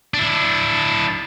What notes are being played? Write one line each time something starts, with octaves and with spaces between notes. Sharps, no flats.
D4 E4